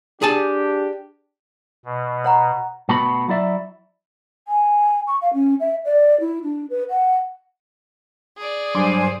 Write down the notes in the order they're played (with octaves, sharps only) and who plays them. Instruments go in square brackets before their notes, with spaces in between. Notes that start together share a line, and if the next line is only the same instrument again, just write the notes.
[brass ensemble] D4 G4 [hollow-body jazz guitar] G#4 G#5 A5
[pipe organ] B2
[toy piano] C#5 F#5 A#5
[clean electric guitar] B2 A3 B3 F#4 B5
F#3 E4 D5 E5
[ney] G#5
C#6
F5
C#4
E5
D5
E4
D4
B4
F#5
[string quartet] G#4 D5
[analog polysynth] G2 [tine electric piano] F#3 C6 D6 [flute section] C5 G#5